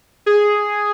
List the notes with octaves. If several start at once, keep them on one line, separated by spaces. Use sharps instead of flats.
G#4